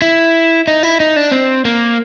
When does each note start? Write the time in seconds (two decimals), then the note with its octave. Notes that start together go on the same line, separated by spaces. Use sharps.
0.02 E4
0.68 D#4
0.83 E4
1.00 D#4
1.16 D4
1.31 C4
1.65 A#3